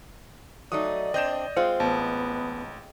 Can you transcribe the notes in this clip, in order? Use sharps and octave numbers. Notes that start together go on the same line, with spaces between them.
F#3 A3 D#4 D5 D#6
C4 D4 D#5 G6 E7
G#3 C4 F4 C5
A1 B3 A5